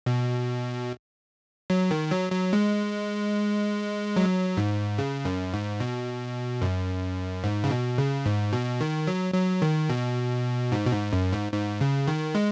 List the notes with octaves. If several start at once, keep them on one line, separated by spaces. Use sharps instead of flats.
B2
F#3
D#3
F#3
F#3
G#3
F#3
G#2
C#3
F#2
G#2
B2
F#2
G#2
C#3
B2
C#3
G#2
B2
D#3
F#3
F#3
D#3
B2
G#2
B2
G#2
F#2
G#2
G#2
C#3
D#3
G#3